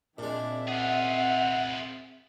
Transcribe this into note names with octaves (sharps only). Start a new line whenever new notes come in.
A#2 G#3 C4 D4 E5
F4 G#4 F#5